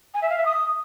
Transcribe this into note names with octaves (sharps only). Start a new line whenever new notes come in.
G#5
E5
F5
E5
D#6